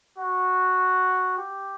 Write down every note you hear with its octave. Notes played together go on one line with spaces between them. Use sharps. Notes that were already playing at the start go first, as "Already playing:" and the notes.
F#4
G4